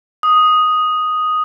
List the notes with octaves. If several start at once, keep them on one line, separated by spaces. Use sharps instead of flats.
D#6